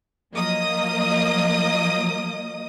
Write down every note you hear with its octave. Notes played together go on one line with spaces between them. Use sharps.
F3 F#3 A#3 D#5 D#6